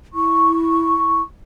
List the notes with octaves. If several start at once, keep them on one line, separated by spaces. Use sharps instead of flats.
E4 C#6